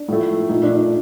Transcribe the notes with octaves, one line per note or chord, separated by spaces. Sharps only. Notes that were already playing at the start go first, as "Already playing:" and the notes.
Already playing: D4
A2 F3 A3
A#2 A3 D#4
D4
D4